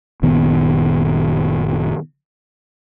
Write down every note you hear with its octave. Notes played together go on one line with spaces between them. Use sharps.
F#1 A#2 D#3 B3